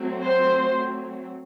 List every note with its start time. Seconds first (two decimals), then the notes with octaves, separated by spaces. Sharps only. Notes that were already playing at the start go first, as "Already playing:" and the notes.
Already playing: F#3 A3 C4
0.23 C5